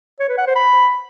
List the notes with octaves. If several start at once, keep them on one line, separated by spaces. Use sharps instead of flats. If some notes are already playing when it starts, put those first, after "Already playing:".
C#5
B4
F#5
C5
B5